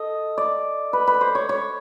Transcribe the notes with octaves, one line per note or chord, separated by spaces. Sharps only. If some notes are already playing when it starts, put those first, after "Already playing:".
Already playing: A4 D#5
D5
B4
B4
C5
C#5
C#5